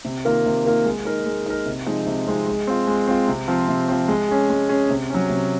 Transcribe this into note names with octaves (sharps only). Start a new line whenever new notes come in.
C3
D#3 A#3 F4 A#4
C3
D#3 A#3 F4 A#4
G#3
D#4 A#4
G#3
D#4 A#4
C3
F3 G#3 C4 D#4
C3
F3 G#3 C4 D#4
G#3
C4 F4
G#3
C4 F4
C3
F3 C4
C3
F3 C4
G#3
C#4 G#4
G#3
C#4 G#4
C3
F#3 C#4
C3